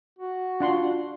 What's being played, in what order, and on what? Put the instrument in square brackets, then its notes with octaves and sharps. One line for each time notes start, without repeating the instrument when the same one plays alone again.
[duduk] F#4
[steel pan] D4 F#5 C6 [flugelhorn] F4